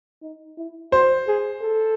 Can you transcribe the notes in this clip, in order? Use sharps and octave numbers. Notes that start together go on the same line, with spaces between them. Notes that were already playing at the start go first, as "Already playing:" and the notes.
D#4
E4
F#4 C5
G#4
A4